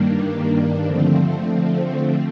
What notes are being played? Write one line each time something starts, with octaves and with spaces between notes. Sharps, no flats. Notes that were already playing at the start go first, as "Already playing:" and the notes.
Already playing: G2 D#3 G3 A#3 D4
D3 F3 A3 C4